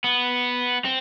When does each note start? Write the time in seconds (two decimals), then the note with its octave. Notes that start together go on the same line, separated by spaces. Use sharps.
0.04 B3
0.85 C4